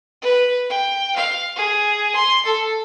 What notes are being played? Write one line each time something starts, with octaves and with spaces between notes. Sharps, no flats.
B4
G5
F5
G#4
C6
A4